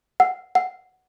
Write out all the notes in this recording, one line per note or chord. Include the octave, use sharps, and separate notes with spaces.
F#5
F#5